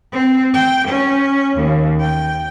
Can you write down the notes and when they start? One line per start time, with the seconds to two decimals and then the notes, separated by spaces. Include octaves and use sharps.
0.13 C4
0.54 G5
0.88 C#4
1.57 D#2
2.01 G5